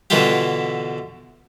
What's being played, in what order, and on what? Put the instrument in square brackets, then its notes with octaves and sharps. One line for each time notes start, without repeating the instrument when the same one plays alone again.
[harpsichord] B2 D3 E3 E4 F4 G4